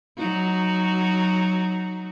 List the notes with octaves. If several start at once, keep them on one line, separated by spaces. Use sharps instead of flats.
F#3 D#4 F#4